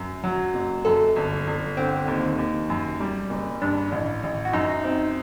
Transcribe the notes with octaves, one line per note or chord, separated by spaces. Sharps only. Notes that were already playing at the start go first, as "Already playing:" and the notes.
Already playing: F#2
F#3
F#1
F#2 A4
G1
G1
D3 C4
D#2
D#2
F#2
G3
F#1
G2 D4
A1
A1
F#4
F#2 D#4
C4